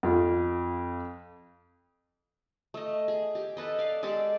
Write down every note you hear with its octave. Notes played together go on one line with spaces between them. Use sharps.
F2 F4
A3 D#5
G#4
G4
A4 B4 D#5
D5 F5
G#3 G4 A4 D5